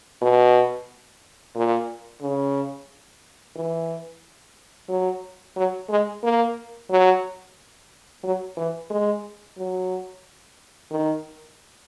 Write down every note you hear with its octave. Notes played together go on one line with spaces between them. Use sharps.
B2
A#2
C#3
E3
F#3
F#3
G#3
A#3
F#3
F#3
E3
G#3
F#3
D#3